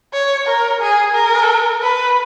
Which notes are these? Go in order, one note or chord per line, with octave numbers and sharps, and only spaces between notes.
C#5
A#4
G#4
A#4
B4